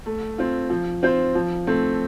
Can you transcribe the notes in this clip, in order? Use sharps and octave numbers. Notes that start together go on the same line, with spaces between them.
A3
C4 F4
F3
C4 F4 C5
F3
A3 C4